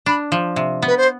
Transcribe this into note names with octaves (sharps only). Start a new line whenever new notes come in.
D4 B5
F3
C3
B3 B4
C5